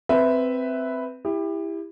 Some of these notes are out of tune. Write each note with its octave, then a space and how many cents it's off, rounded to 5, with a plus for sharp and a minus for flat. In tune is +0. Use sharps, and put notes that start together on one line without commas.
C4 -10 B4 +5 E5 +0
E4 +0 G4 +30